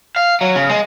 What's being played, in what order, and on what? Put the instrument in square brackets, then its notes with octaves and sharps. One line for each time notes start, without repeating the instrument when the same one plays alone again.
[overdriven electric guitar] F5
F#3
C#3
G#3